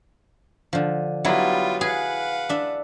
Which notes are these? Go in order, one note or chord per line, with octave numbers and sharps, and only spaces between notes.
D3 F3
F#3 G3 B3 E4 F4
G#4 B4 F5 F#5
D4 E5